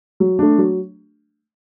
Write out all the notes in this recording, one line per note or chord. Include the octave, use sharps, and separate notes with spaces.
F#3
A3 D4
F#3